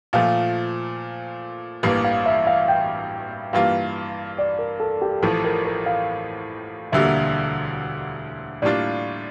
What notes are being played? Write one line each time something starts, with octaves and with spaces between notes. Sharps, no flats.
A#2 F3 A3 F5
A1 G2 E3 G3 A#3
F5
E5
F5
G5
G2 E3 G3 A#3 F4 F5
D5
A#4
A4
G4
A1 A2 F3 A4
A#4
A#4
F5
E1 D2 D3 G3 A#3 E5
A2 G3 A#3 D4 F4 D5